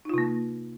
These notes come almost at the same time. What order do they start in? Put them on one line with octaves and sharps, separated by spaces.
D#4 F4 C3 A#3